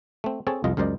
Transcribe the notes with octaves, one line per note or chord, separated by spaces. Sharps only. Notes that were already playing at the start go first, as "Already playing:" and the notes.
A3 C4
C4 G#4 A4 C#5 A5
C2 F2 F4 D#5
C#2 F#2 A#4 C5 D5 D#5